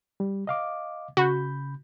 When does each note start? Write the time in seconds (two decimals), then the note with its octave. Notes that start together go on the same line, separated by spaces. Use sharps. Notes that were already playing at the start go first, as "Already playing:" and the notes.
0.20 G3
0.47 D#5 F5 D6
1.17 C#3 F#4 B5 G6